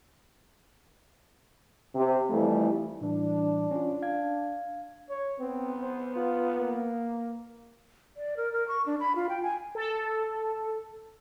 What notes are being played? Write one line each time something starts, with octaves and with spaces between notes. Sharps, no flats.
C3
F2 E3 G3 A3
A2 E3 G3 D4
C#4 F4
F5 G#6
C#5
B3 C4
C5
F4
A#3
D5
A#4
A#4
C#6
D4
B5
F4
G5
G#5
A4